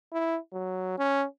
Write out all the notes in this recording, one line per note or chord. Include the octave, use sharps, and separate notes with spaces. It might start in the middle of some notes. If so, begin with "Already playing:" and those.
E4
F#3
C#4